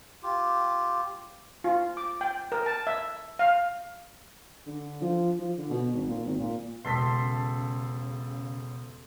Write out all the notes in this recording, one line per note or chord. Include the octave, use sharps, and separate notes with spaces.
F4 G4
F4
D6
G5
A#4
A5
E5
F5
D3
F3
F3
D3
B2
G#1
A#2
G#1
A#2
E1 C#3 A4 C6 B6